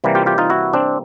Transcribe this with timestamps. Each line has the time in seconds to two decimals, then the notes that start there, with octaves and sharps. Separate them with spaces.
0.04 C3 E3 G3 A#3
0.15 F4 G4
0.26 F4 G4
0.38 D#4 F4
0.50 E4 F#4
0.73 C4 D4